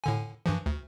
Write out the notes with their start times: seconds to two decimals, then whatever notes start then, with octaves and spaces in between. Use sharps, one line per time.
0.04 A2 D3 G#5
0.46 G2 E3 F3
0.66 D2